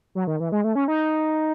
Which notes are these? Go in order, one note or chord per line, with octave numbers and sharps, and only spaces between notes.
F#3
D#3
E3
G#3
A3
C#4
D#4